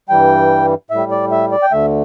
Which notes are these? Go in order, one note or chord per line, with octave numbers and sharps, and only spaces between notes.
G2 E3 G3 G5
A2 G3 E5
D5
E5
D5
G5
D2 D3 A3 E5